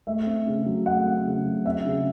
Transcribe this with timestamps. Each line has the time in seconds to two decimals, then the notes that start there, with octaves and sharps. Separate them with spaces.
0.07 A3 E5
0.27 C4
0.47 C#3
0.66 F#3
0.86 A3 F#5
1.06 C4
1.26 C#3
1.45 F#3
1.65 C4 E5
1.85 C#3